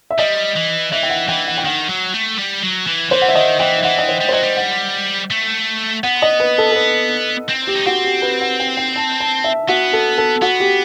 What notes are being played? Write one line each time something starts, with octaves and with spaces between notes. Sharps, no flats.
E5
G3 D#5
E3
E3 E5
G5
F#5
E3 G5
F#5
G5
D#3 F#5
F#3
A3
G3
F#3
E3
E3 C5
F#5
E5
D#3 D#5
E3 G5
E5
E3 F#5
D#5
C5
G3
C5
F#3 D#5
G3
F#5
A3
B3 F#5
D#5
B4
A4
A4
B4
C4
G4
D#4
C4 F#4
G4
B4
F#5
G5
G5
A5
A5
E5
B3 F#4
A4
A4
B3 F#4
G4